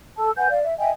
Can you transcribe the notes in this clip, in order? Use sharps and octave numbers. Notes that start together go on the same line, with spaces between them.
A4 A5 E6
B4 F#5 G#5 G6
D5 F5
E5
D#5 E5 G5 G#5